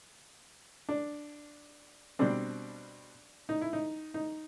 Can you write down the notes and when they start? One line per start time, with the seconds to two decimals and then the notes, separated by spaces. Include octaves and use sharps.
0.89 D4
2.19 B2 G3 C4 D4
3.49 D#4
3.61 E4
3.73 D#4
4.14 D#4